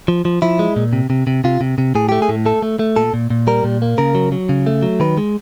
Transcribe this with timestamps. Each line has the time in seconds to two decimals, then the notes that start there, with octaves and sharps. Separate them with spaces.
0.08 F3
0.25 F3
0.42 F3 E4
0.59 G#3
0.76 A#2
0.93 C3
1.10 C3
1.27 C3
1.44 C3 F4
1.61 C3
1.78 C3
1.95 A2 G#4
2.09 A3 G4
2.22 G#4
2.29 A2
2.46 A3 A4
2.62 A3
2.79 A3
2.96 A#2 A4
3.14 A#2
3.30 A#2
3.47 G3 A#4
3.64 A#2
3.82 A#3
3.98 C#3 A#4
4.15 F#3
4.32 F#3
4.49 C#3
4.66 A3
4.83 F#3
5.00 D#3 B4
5.18 G#3